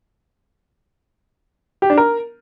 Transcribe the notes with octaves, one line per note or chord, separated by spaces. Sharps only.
G4
D4
A#4